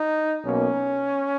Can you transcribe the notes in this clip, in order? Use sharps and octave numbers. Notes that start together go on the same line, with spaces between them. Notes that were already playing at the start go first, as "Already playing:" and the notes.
Already playing: D#4
B1 B2 A#3 C#4